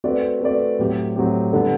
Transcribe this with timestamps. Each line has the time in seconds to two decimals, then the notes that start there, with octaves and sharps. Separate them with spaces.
0.04 A3 C4 F#4 B4 D5
0.41 A3 C4 F#4 B4 D5
0.79 A2 F#3 C4 G4
1.16 A2 F#3 C4 G4
1.53 D3 G3 B3